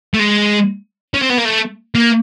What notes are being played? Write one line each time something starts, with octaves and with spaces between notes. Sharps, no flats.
A3
G#3
C#4
C4
B3
A#3
A3
A#3